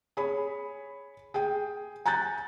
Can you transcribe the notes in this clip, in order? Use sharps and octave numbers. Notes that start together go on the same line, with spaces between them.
G#4 C#5 B5
G#4 G5
G#5 A#5 F#6 G6 A6